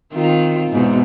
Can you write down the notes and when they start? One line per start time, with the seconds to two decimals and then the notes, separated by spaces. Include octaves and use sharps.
0.13 D#3 C4 F4
0.71 E2 G#2 B2